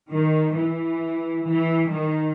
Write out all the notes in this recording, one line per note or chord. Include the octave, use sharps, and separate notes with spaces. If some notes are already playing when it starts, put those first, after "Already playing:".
D#3
E3
E3
D#3